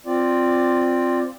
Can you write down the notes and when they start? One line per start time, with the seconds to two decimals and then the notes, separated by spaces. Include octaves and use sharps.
0.06 C4 F4 D5